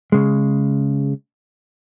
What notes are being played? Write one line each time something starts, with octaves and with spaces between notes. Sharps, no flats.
C#3 G#3